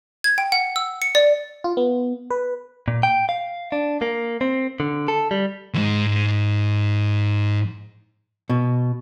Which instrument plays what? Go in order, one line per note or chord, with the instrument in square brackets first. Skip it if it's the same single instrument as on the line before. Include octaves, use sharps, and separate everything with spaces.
[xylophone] G#6
G5
F#5
E6
C#7
D5
[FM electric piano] F4
B3
B4
[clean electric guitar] A#2
G5
F5
D4
A#3
C4
D3
A4
G3
[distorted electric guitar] D2 G#2
[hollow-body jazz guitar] B2